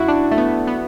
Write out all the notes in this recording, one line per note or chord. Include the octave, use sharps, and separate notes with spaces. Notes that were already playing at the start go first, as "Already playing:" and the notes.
Already playing: F#2 E4 F#4
D4
A3
B3
B3